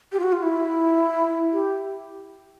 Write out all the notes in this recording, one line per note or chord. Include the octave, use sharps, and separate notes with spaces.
G4
F4
F#4
F4
E4
G4